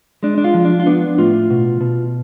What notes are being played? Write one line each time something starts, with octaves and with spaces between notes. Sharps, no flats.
G#3 D4
D4
F4
F3
D4
F4
B3 D4
A2 F4
B2
B2